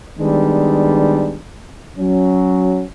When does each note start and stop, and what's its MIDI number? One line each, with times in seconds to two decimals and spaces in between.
0.18 1.38 51
0.18 1.38 55
0.18 1.38 56
0.18 1.38 59
0.18 1.38 62
1.97 2.82 54
1.97 2.82 61